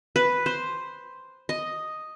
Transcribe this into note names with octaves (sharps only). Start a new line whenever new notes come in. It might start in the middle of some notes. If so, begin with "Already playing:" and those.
B4
C5
D#5